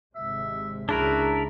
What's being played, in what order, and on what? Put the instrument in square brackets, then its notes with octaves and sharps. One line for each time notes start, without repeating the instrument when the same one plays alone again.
[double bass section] G#1 C3 G#3 [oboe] E5
[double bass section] C#2 C#3 [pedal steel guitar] D4 E4 A#4 [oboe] F#4 [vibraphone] G#4